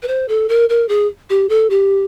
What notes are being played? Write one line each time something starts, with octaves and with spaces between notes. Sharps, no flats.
B4
C5
A4
A#4
A#4
G#4
G4
A4
G4